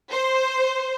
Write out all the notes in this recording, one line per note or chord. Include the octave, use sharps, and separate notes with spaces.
C5